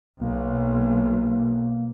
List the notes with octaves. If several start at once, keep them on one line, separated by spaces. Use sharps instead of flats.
B1 A#3